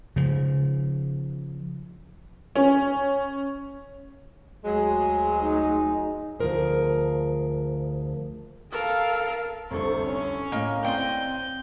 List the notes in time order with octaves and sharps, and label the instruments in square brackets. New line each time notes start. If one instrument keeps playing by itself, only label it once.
[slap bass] C#3 F3
[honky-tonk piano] C#4
[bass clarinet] D2 [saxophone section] F#3 G#3 [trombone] G#4
[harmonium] D#4 [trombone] G#4
[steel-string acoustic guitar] D2 F3 G#4 A#4 C5
[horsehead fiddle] A4 F5 [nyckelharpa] A#4
[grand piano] F1 C2 D3 [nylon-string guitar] C4 A4 [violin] C5 C#6
[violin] C#4 [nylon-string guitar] C#5
[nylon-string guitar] A2 [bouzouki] A#3 [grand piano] D#5
[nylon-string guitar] C4 [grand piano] D5 C6 [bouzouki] D#5 F5 G5 [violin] G6